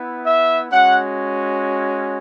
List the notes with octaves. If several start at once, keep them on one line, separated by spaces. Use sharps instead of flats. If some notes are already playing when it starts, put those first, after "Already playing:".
Already playing: B3 E4
E5
G#3 C#4 F#4 F#5